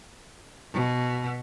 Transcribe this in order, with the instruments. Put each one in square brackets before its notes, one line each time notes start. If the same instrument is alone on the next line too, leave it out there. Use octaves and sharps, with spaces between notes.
[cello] B2